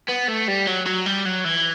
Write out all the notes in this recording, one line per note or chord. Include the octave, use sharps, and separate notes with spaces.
B3
A3
G3
F#3
F#3
G3
F#3
E3